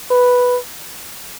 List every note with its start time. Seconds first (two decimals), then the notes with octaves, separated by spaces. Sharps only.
0.11 B4